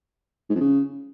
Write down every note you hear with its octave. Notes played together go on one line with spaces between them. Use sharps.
G#2
F2
C#3